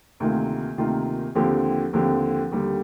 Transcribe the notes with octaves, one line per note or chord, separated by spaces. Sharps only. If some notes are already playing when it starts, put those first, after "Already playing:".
D2 C3 D#3 A#3 F4
D2 C3 D#3 A#3 F4
D#2 D3 F3 C4 G4
D#2 D3 F3 C4 G4
D#2 D3 G3